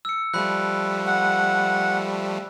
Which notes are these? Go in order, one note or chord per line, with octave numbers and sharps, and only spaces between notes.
E6 C#7
F3 G3 A3 B5 F#6
F#5